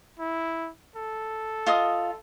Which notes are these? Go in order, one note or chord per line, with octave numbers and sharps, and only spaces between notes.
E4
A4
F4 D#5 D#6